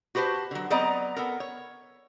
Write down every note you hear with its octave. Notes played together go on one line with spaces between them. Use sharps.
F#4 G4 B4 C5 A5
D3 F#3
F#3 B3 C4 D5 D#5 A#5
B3 A4 A#4
C#5